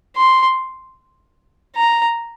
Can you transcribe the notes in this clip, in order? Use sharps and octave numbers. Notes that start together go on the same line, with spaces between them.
C6
A#5